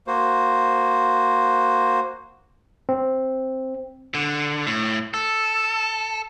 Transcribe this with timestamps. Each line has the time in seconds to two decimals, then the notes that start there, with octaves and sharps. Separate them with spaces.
0.07 A#3 F#4 C5
2.89 C4
4.15 D3
4.67 A2
5.14 A4